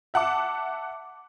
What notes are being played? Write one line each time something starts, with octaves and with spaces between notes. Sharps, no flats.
E5 F#5 A5 D6